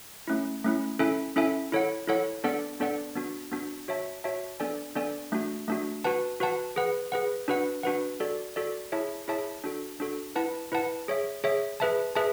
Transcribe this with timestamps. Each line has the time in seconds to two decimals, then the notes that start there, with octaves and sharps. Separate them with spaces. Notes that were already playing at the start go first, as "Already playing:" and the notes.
0.27 A3 C#4 E4
0.64 A3 C#4 E4
0.99 C#4 E4 A4 E5 G#5
1.36 C#4 E4 A4 E5 G#5
1.72 E4 A4 C#5 F#5
2.08 E4 A4 C#5 F#5
2.44 B3 D4 A4 D5 F#5
2.80 B3 D4 A4 D5 F#5
3.15 B3 D4 F#4
3.52 B3 D4 F#4
3.88 F#4 C#5 E5 A5
4.24 F#4 C#5 E5 A5
4.60 B3 D4 A4 D5 G#5
4.96 B3 D4 A4 D5 G#5
5.32 A3 D4 F#4
5.68 A3 D4 F#4
6.04 F#4 B4 F#5 A5
6.40 F#4 B4 F#5 A5
6.76 G#4 B4 F#5
7.12 G#4 B4 F#5
7.48 D4 F#4 B4 F#5
7.83 D4 F#4 B4 F#5
8.20 F#4 A4 D5
8.56 F#4 A4 D5
8.92 E4 G#4 C#5 E5 A5
9.28 E4 G#4 C#5 E5 A5
9.64 D4 F#4 A4
10.00 D4 F#4 A4
10.35 E4 B4 F#5 A5
10.72 E4 B4 F#5 A5
11.08 G#4 C#5 E5
11.44 G#4 C#5 E5
11.80 G#4 B4 E5 A5
12.15 G#4 B4 E5 A5